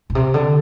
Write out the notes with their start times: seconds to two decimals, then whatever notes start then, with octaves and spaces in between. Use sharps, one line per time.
0.10 A#2
0.15 C3
0.34 D3